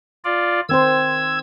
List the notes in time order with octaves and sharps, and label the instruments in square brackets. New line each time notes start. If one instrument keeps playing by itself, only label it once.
[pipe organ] F4 D5
[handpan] D#3 C4 C5 [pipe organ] E6 G#6